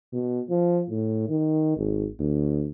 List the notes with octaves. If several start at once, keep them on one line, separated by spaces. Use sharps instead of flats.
B2
F3
A2
D#3
G#1
D2